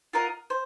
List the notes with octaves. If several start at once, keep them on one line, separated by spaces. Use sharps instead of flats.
F4 A#4 D#5 F#5
C5